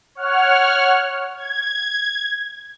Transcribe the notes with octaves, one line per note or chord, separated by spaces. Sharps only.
C#5 F#5 F6
G#6